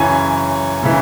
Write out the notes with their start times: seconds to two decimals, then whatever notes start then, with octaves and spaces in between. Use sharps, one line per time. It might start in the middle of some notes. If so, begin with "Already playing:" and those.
Already playing: F#2 C#3 E3 G#5
0.83 C#3 E3